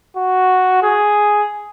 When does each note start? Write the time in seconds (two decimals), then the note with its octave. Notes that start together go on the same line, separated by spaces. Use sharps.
0.17 F#4
0.83 G#4